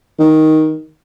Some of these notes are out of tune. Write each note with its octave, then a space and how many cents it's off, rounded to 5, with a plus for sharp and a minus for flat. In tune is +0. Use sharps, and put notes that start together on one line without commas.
D#3 +10